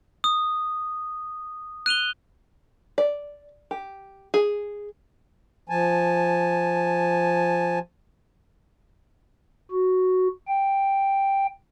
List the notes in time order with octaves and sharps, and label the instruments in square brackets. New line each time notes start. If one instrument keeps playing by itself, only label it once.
[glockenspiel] D#6
F#6 D#7 F7 G7
[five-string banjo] D5
G4
G#4
[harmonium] F3 G#5 A5
[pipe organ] F#4
G5